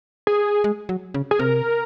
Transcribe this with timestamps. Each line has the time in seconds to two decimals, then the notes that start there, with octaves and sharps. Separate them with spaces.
0.27 G#4
0.64 G#3
0.89 F#3
1.14 C#3
1.31 G#4
1.39 C3 A#4